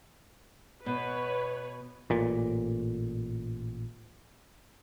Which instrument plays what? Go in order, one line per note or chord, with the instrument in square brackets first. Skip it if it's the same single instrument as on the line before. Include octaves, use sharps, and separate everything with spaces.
[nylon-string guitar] B2 [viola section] B4 C#5
[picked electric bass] A1 A#2